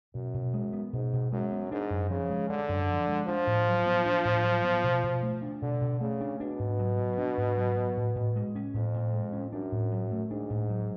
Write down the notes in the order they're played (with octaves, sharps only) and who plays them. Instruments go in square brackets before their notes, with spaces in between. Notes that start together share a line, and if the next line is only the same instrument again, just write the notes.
[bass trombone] F#2 [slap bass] B2
[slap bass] B2
G#3
B3
[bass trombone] G#2 [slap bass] B2
[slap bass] B2
[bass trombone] F#2 [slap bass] G#3
[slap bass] B3
[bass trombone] G#2 [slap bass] D4
[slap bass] F#2
[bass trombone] C#3 [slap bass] F3
[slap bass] G#3
[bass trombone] D3 [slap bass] D4
[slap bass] F#2
F3
G#3
[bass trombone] F3 [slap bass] D4
[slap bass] A2
F#3
B3
D4
A2
F#3
B3
B2
B2
A3
D4
[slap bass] B2 [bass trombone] D3
[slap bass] B2
[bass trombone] C#3 [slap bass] A3
[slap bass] D4
[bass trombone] B2 [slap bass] D4
[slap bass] G#2
F#3
B3
D4
G#2
F#3
B3
A2
A2
G#3
C#4
[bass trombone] F2 [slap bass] A2
[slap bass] A2
G#3
C#4
[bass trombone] F#2 [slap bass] D4
[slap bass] A2
F#3
A3
[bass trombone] G#2 [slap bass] D4
[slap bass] A2
F#3